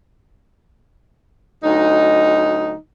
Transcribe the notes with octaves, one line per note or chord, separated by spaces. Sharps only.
D2 F#3 D#4